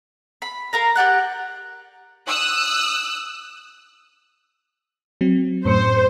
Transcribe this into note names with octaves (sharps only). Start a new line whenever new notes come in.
B5
A#4 F5 A#5
G4 D5 F#5 F#6
D#6 E6 F#6
F#3 C4
F#2 A2 C5 C#7